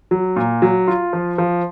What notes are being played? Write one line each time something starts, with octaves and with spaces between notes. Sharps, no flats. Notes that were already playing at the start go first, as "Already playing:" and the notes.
F#3
A#2
F#3
F4
F3
F3